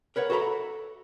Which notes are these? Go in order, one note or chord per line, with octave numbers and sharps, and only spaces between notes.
A#4 B4 C#5 F#5
F#4 A4 E5 A#5 B5